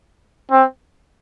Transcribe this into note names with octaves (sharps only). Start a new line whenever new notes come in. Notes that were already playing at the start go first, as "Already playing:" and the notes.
C4